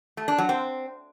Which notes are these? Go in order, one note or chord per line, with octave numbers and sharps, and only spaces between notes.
A3
D4
F#3
C4